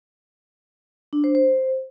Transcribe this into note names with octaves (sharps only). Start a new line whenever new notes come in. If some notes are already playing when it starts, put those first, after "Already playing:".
D4
C5
C5